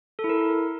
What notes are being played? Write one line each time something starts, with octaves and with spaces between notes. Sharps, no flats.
A4
E4
A#4